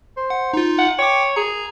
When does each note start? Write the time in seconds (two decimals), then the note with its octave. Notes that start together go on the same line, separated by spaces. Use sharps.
0.17 C5
0.30 F#5
0.54 D#4 F4
0.79 F#5
0.99 C#5 G5 D6
1.36 G#4 A#5